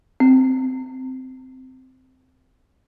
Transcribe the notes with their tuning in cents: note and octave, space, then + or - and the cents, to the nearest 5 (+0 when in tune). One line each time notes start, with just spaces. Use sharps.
C4 -15